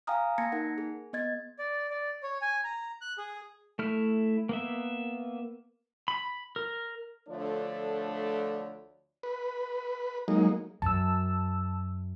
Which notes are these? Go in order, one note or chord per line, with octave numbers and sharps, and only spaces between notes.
F5 G5 G#5 A#5 D#6 F6
A#3 A5 G#6 A#6 C#7
D#4 A#4 F#5
G#4
B3 D#5 G#6 A6
D5
D5
C#5
G#5
A#5
F#6
G#4
A3 E4 F6
A#3 B3 E5
B5
A#4
D2 D3 F3 A3 D4 C#5
B4
F#3 G#3 A#3 D#4
F#2 A5 E6